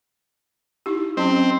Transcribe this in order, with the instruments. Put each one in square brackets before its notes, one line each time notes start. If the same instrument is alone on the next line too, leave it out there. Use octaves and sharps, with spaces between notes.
[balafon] D#4 E4 G4
[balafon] F#3 C#4 [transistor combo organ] C4